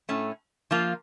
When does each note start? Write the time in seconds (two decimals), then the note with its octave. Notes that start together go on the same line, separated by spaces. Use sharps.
0.09 A2 A3 C#4
0.71 F3 A#3 F4